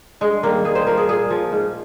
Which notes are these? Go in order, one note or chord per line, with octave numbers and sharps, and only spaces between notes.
G2 G#3
D#3 G3 A#3
G2 G#4
C5
F3 A#4
G#4
A#2 G#4
F3
G#2